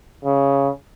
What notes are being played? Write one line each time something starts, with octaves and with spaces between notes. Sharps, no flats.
C#3